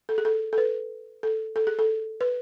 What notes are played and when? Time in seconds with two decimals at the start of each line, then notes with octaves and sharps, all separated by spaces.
0.09 A4
0.18 G#4
0.25 A4
0.53 A4
0.58 B4
1.23 A4
1.56 A4
1.67 G#4
1.79 A4
2.21 B4